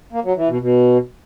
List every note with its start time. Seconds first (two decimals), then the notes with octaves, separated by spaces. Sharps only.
0.13 A#3
0.25 F#3
0.37 E3
0.48 B2
0.60 B2